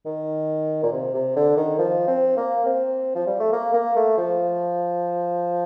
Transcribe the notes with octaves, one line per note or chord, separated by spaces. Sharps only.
D#3
A#2
C3
C3
D3
D#3
F3
C4
A#3
C4
F3
G3
A3
A#3
A#3
A3
F3